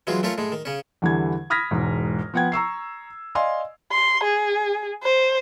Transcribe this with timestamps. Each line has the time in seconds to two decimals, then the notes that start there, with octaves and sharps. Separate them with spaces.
0.07 E3 F#3 G#3 F4
0.23 A3 C#4 F4 A#4 C#5
0.38 A2 G#3
0.52 D#3
0.65 C#3 C#4
1.02 E2 D3 E3 G3 E4 G#6
1.50 B5 D#6 F6 G#6 A#6 B6
1.71 E1 E2 G#2
2.34 F3 B3 F#5 G5 G#6
2.52 A#5 C#6 E6 C7
3.35 D5 D#5 F5 G#5 C6
3.92 C6
4.24 G#4
5.03 C5